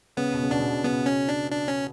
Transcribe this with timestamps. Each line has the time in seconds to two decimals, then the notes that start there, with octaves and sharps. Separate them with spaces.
0.17 C#3 B3
0.34 B2
0.44 C#3
0.51 B2 D4
0.60 C#3
0.67 B2
0.84 C#3 B3
1.06 C#4
1.29 D4
1.52 D4
1.68 C#4